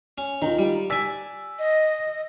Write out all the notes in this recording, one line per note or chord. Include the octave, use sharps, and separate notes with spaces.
C#4
D#3 D#4 F4
G3
D5 G#5 E6 B6
D#5